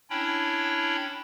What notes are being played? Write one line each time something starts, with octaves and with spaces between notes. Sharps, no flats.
C#4 D4 E4 C#5 G5 B5